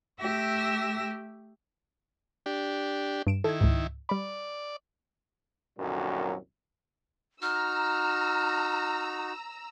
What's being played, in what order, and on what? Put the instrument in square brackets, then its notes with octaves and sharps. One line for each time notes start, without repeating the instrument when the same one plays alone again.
[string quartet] A3 G4 E5 E6 A#6
[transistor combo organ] D4 G4
[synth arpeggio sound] G2 D7 E7
[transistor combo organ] D#3 E4 [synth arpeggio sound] A4 G#6
[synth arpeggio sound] C#2 G#2
[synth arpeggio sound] G3 B5 [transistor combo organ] D5
[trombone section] C2 F#2 A#2 D3 D#3 F#3
[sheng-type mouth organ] D#4 F#4 [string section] A#5 E6 [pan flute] F6